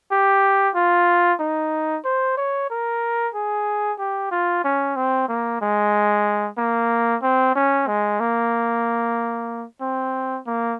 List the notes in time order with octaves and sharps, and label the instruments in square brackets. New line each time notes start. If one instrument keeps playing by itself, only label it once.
[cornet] G4
F4
D#4
C5
C#5
A#4
G#4
G4
F4
C#4
C4
A#3
G#3
A#3
C4
C#4
G#3
A#3
C4
A#3